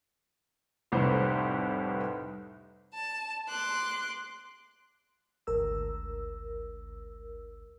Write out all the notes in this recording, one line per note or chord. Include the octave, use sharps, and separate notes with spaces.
F1 C2 A2 B4 C5
A5
C6 D6 F#6
G#1 D2 A#4 E6